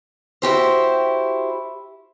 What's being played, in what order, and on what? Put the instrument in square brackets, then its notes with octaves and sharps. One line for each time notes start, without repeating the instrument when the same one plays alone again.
[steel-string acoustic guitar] E4 F#4 G4 C5